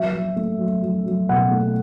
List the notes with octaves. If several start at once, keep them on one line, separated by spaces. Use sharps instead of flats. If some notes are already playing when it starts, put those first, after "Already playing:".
Already playing: F#3 E5
F#3
A3
F#3
F#3
F#3
B2 F#5
A3